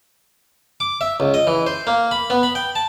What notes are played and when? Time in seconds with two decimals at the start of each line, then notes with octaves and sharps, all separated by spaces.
0.80 D6
1.01 E5
1.20 C#2
1.34 D#5
1.47 E3
1.67 C5
1.87 A#3
2.11 B5
2.30 B3
2.43 B5
2.55 G5
2.75 A5